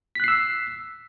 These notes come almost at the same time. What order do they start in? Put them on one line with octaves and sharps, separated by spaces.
B6 F#6 C7 E6